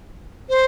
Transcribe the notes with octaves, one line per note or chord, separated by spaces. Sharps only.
C5